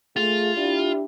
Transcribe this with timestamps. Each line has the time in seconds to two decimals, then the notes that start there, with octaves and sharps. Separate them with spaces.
0.17 A3 F4 G#4
0.57 D4 E4 G4